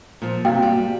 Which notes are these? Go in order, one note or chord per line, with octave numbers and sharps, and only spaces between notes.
A#2 F3
G2 C3 A#3 F#4 F5 G5
G3